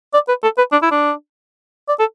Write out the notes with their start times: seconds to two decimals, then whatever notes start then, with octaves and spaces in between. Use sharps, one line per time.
0.14 D5
0.28 B4
0.43 A4
0.58 B4
0.72 D4
0.82 E4
0.91 D4
1.88 D5
1.99 A4